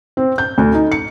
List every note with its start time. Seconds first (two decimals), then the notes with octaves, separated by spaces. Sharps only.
0.17 C4
0.38 G6
0.58 D2
0.74 D#4
0.92 C#7